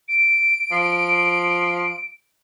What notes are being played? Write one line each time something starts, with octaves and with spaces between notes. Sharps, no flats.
D7
F3